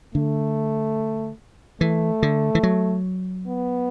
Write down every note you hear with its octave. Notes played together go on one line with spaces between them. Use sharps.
D3 A3
E3 A3
D3
E3
F#3
B3